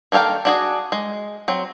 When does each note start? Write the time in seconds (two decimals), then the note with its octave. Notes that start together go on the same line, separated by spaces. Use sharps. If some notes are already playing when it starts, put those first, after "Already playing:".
0.12 D#3 A#3 A4 F5 G5
0.45 D4 F#4 G#4
0.92 G#3
1.48 F#3 C4